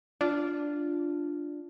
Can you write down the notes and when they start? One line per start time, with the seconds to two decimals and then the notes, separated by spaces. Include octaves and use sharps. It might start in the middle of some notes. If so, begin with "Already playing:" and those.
0.21 D4 F4